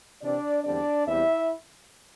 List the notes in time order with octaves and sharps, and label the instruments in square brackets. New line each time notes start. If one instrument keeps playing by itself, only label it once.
[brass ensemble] C3 E3 C4 D4 D5
E2 D3 G3 C4 D4 D5
E2 E3 G3 C4 E4 E5